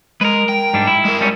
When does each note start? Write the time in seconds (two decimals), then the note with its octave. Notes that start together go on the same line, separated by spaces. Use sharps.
0.21 G#3 A#4 B4
0.49 G5
0.74 G#2 G3 D4
0.87 E4
1.05 G#3 A#4
1.21 G3 C#4